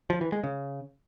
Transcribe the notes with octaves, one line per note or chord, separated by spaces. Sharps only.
F3
E3
G#3
C#3